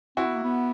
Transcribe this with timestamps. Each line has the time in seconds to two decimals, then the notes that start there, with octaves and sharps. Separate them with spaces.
0.17 C4 E4 F#4
0.26 B3
0.35 A#3
0.43 B3